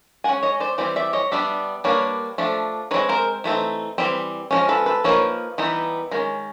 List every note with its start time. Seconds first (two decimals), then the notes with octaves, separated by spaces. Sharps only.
0.24 G#3 C#4 F#5 G#5
0.43 C#5 D#5
0.60 C5 D5
0.78 E3 G3 C4 C5 D5
0.96 D5 E5
1.13 C#5 D#5
1.32 G3 B3 D4 D5 E5
1.84 G3 A#3 D4 B4 C#5
2.38 F3 A3 D4
2.91 G#3 C4 D#4 B4 C#5
3.09 A#4 C5
3.44 E3 A3 C4 D#4
3.98 E3 G3 C4
4.51 F3 G#3 C#4
4.69 A4 B4
4.86 A4 B4
5.04 F3 A#3 D#4 B4 C#5
5.58 E3 G3 B3 D#4
6.11 D#3 G#3 C#4